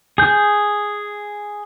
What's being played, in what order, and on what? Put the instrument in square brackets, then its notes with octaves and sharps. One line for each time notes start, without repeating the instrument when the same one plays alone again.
[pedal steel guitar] G#4 G6